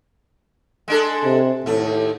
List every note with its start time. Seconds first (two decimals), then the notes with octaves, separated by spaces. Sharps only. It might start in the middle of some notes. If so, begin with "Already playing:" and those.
0.88 G#3 D4 A4
1.25 C3
1.66 D#2 A2 A3